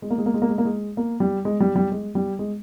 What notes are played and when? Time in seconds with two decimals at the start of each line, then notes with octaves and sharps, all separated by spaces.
0.02 G#3
0.10 A#3
0.18 G#3
0.26 A#3
0.34 G#3
0.42 A#3
0.49 G#3
0.58 A#3
0.65 G#3
0.97 A#3
1.20 G3
1.45 G#3
1.60 G3
1.76 G3
1.92 G#3
2.15 G3
2.39 G#3